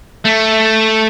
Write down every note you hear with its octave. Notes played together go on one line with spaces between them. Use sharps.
A3